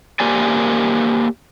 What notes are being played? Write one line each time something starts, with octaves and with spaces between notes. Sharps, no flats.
A#3 G4 A#4 C5 D5 G#5